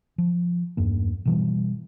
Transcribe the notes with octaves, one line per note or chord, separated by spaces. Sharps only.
F3
E2 G2 A#3
B2 E3 G3